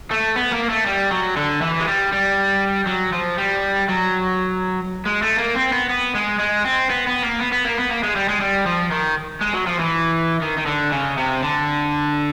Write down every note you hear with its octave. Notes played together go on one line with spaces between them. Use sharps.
A3
B3
A#3
A3
G3
F#3
D3
E3
G#3
G3
G3
F#3
F3
G3
F#3
G#3
A3
A#3
C4
B3
B3
G#3
G#3
C4
B3
B3
A#3
B3
B3
A#3
B3
A#3
G#3
G3
G#3
G3
F3
D#3
G#3
F#3
F3
E3
D#3
D#3
D3
C#3
C3
D3